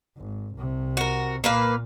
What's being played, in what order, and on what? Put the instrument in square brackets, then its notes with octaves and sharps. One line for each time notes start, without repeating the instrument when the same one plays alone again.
[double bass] G#1
C2 C3
[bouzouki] F#4 A#4
[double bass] A#2 [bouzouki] A#3 B4 F5